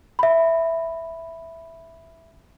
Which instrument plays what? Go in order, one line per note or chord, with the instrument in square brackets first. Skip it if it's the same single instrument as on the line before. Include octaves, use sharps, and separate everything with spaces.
[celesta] E5 B5